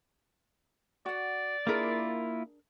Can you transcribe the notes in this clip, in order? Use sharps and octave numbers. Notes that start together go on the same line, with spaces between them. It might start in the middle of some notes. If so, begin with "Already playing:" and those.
F#4 D5 F#5
A#3 D4 E4 F4 G#4 A#4